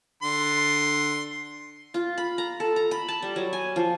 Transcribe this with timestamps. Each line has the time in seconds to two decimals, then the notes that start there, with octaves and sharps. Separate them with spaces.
0.23 D3 C6
1.94 F4
2.18 B5
2.38 A#5
2.60 A4
2.76 A#5
2.91 B5
3.08 A5
3.22 G3
3.36 F#3
3.53 G#5
3.76 F3